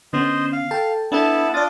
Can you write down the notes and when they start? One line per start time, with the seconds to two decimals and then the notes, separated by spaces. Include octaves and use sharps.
0.13 D3 B3 C#4 C5 D#5
0.53 F5
0.71 A4 G5 A5
1.12 B3 D4 E4 A4 A5
1.54 D4 F4 D5 D#6 A6